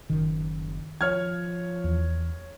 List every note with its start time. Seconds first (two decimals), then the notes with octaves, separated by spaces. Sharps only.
0.10 F#1 D#3
1.01 F3 C#5 F6 G#6
1.84 E2